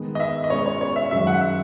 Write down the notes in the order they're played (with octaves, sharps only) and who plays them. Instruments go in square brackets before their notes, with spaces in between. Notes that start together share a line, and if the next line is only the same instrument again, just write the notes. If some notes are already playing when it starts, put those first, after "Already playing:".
Already playing: [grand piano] D#3 G#3 B3
[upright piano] D#5
E5
D#5
[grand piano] B2 G#3 C#4 [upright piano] C#5
[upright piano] C#5
C#5
E5
[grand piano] F#2 D#3 G#3 C#4 F#4 [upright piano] E5
[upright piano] F#5
E5